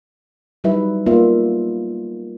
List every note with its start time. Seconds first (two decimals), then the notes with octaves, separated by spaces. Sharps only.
0.64 F#3 G3 D#4 E4 B4 E5
1.06 A#3 B3 F4 D5 E5